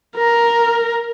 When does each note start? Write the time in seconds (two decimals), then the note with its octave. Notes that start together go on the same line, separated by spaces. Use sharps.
0.17 A#4 A#5